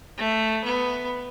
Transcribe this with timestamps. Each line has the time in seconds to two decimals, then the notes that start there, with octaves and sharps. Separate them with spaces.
0.18 A3
0.64 B3